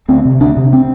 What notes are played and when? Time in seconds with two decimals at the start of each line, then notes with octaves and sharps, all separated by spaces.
0.08 D2 C4
0.25 C3
0.40 D2 D4
0.57 C3
0.73 C4